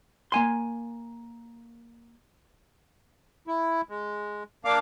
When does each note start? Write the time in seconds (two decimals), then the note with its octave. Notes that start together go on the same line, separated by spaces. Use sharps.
0.32 A#3 G#5 C6
3.47 E4
3.89 G#3
4.65 A#3 D4 F5 D6